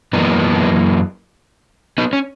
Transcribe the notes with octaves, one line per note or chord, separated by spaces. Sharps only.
F#2 E3 A#3 B3 D#4
B3 D#4
C#4